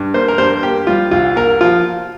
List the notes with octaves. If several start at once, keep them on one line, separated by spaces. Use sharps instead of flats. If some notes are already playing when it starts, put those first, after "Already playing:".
Already playing: G2
A#3 C5
A#4
G2 C5
A#3 G4
G3 F4
C2 F4
A#3 A#4
F3 F4